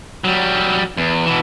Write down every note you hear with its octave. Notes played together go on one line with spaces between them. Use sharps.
F#3 G3
E2
B2 E3